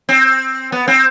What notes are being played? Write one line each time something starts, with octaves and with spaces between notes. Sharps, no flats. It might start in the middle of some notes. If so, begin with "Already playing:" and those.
C4
B3
C4